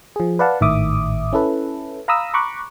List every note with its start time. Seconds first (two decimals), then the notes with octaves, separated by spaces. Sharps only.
0.16 F3 G#4
0.39 B4 D5 F5 F#5 A5
0.61 G#1 A2 D#3 E5 D6 D#6
1.33 C#4 E4 A4 B4
2.08 F5 A#5 B5 D#6 E6
2.34 A#5 B5 C#6 D6 F#6